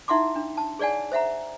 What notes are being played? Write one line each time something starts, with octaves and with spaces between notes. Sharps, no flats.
D#4 E4 E5 F#5 C6 D6
D4
A5
G#4 C#5 D5 F#5 G#5
C5 E5 F#5 A#5